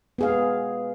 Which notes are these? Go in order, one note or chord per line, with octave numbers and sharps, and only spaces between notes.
B3 G#4 F5